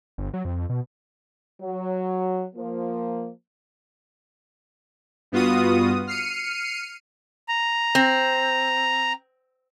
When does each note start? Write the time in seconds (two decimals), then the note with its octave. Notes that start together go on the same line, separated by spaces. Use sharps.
0.18 G1
0.34 F#3
0.45 F2
0.69 B2
1.61 F#3
2.56 F3 A#3
5.32 G2 B3 F4 F#4 D#6
6.07 F6 C7 C#7 D#7
7.48 A#5
7.95 C4